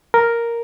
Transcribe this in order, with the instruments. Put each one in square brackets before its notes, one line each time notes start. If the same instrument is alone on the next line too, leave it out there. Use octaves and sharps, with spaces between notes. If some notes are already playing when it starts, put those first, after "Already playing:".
[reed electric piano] A#4